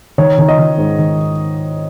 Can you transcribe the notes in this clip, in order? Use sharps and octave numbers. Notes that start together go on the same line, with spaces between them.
D#3 C#5
D#3
D#5
D#3
G#2
D#3